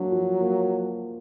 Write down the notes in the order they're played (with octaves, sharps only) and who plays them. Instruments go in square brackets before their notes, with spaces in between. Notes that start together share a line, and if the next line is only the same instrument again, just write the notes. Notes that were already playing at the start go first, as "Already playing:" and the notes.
Already playing: [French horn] F#3 [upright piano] A#3 D4
[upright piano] F3
A#3